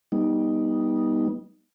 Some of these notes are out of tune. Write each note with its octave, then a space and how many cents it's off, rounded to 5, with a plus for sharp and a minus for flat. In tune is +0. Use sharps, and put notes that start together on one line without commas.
G3 +0 B3 -30 D#4 +0